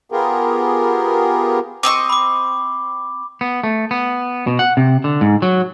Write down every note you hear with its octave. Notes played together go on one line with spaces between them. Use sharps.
B3 F4 G4 G#4 A#4
C4 D#5 C#6 D6
B5 D6
B3
A3
B3
B2
F#5
C3
D3
G#2
F#3